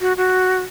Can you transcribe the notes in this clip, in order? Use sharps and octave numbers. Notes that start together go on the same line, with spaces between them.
F#4
F#4